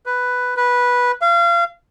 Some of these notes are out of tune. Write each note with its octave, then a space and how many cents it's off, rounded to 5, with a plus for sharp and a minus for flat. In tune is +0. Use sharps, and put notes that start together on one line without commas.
B4 +5
B4 -10
F5 -30